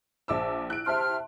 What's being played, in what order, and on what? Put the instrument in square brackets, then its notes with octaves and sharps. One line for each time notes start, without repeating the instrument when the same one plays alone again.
[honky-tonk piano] A#1 D6 E6 [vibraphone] C5 E5 A5
[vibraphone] E4 [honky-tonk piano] F#6 D7
[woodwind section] C3 F6 [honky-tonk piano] E5 A5 C6